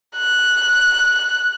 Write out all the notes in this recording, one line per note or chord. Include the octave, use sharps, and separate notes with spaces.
F#6